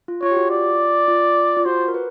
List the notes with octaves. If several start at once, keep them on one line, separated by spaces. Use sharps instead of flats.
F4
F4 C#5
G4
F#4
F4 D5
F4
F4
F#4 C5
A#4
B4